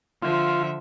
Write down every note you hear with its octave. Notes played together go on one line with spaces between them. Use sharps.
D3 F3 F4 E5